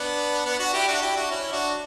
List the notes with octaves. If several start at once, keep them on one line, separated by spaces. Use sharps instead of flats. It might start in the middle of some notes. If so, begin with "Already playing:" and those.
Already playing: B3 D4
B3 D4
D4 F#4
E4 G4
D4 F#4
E4 G4
D4 F#4
C#4 E4
D4 F#4